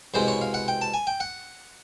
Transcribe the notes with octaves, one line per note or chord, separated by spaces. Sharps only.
C2 B2 G#3 C5
C#5
F5
F#5
G5
A5
G#5
G5
F#5